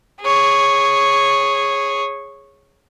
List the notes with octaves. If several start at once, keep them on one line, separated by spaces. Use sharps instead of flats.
G#4 C#5